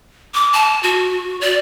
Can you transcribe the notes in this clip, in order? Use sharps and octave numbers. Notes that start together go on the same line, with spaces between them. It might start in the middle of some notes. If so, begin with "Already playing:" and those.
D6
A5
F#4
D5